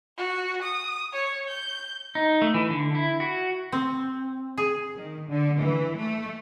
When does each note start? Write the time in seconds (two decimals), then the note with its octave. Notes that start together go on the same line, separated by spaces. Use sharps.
0.18 F#4
0.62 D#6
1.13 C#5
1.48 G6
2.15 D#4
2.42 A3
2.54 E3
2.70 D3
2.95 E4
3.20 F#4
3.72 C4
4.58 G#4
4.97 D#3
5.29 D3
5.60 E3
5.98 A3